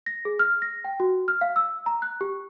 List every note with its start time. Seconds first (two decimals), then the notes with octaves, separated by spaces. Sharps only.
0.06 A#6
0.25 G#4
0.39 F6
0.62 A#6
0.84 G5
1.00 F#4
1.28 F6
1.41 F5
1.56 E6
1.86 A#5
2.02 F#6
2.21 G4